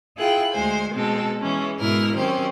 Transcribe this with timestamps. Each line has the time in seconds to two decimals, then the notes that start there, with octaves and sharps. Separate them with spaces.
0.18 E4 F4 G#4 G5 F#6
0.52 D2 G#3 C5 G#5
0.93 B2 G#3 C4 A4
1.40 E3 G#3 C#4
1.79 G#2 B2 G#3 E4 A#4 F6
2.16 D#3 F#3 C4 C#4 G4 C5